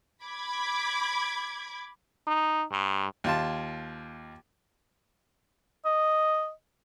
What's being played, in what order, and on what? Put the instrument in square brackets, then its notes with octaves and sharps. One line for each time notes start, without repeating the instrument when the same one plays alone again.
[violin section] B5 D6 G#6
[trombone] D#4
G2
[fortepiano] D#2 F4 A5
[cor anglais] D#5